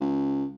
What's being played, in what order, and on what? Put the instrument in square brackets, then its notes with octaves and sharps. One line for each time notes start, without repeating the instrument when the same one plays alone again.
[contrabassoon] C#2